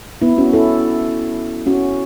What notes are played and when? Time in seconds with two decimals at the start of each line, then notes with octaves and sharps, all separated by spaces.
0.22 B3 E4
0.38 C#4 F#4
0.53 E4 A4
1.67 C#4 F#4